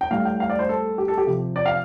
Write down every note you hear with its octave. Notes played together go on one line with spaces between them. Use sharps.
G5
A2 G3 F5
G5
F5
D5
C5
A4
G4
A4
G4
C3 F3
D5
F5